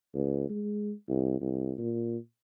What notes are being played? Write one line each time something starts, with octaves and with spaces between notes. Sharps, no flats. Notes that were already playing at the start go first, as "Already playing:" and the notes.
C#2
G#3
C2
C2
A#2